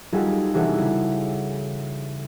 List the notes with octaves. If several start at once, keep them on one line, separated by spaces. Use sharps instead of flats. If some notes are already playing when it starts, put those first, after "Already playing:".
G3 D#4 F4 F#4 G#4 A4
C3 E3 D4 F#4 G#4 A4
C#3